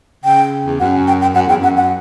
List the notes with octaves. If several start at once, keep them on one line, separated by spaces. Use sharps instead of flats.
C#3 G5
E2
F#2 F#5
G5
G5
F#2 F#5
E2 G5
F#2 F#5
F#5